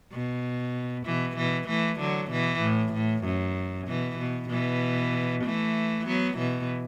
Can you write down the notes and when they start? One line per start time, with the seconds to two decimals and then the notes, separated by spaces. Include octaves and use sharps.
0.12 B2
1.05 B2 E3
1.37 B2 E3
1.68 E3 A3
2.00 D3 F#3
2.31 B2 E3
2.62 A2
2.94 A2
3.25 F#2
3.88 B2 E3
4.19 B2
4.50 B2 E3
5.44 E3 A3
6.07 F#3 B3
6.38 B2 E3